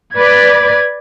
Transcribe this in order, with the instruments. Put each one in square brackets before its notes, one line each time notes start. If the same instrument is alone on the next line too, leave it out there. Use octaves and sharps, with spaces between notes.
[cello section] B4 D5 [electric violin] G#6